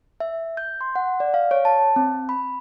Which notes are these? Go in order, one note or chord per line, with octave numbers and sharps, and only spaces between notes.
E5
G6
C6
F#5
D5
F5
C#5
A5
C4
B5